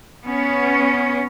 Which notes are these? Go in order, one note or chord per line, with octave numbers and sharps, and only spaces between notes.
B3 C#4